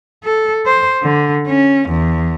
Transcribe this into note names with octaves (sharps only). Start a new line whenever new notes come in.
A4
C5
D3
C#4
E2